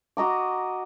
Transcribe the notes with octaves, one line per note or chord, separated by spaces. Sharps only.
F#4 D#5 A#5 D6